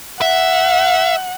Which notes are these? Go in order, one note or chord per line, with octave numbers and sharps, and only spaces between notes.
E5 F#5